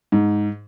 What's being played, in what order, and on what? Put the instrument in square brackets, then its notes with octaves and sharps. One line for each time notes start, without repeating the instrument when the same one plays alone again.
[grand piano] G#2